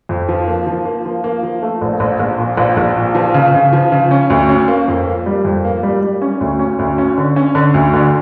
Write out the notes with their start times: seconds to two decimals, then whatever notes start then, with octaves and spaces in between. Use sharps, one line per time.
0.09 F2
0.29 F3
0.48 A#3
0.67 F3
0.85 A#3
1.05 F3
1.24 A#3
1.43 F3
1.62 A3
1.82 A#1
2.00 A#1
2.20 A#1
2.38 A#2
2.57 A#1
2.77 A#1
2.97 A#2
3.15 F3
3.34 C#3
3.54 C#3
3.73 F3
3.92 C#3
4.11 C#4
4.30 D2
4.49 C#4
4.68 A#3
4.88 F2
5.07 A#3
5.26 G3
5.44 F2
5.65 A#3
5.83 G3
6.03 G3
6.22 C#4
6.41 D2
6.59 C#4
6.79 D2
6.98 C#4
7.18 D3
7.36 C#4
7.55 D3
7.74 D2
7.93 D3